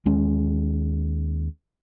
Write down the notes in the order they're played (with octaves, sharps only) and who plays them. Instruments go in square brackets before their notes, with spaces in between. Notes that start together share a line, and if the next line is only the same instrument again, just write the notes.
[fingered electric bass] D#2 G#3 C#4